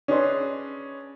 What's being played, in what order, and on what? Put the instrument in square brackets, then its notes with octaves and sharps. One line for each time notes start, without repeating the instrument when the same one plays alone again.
[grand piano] C#4 D4 G#4 B4 D#5 C6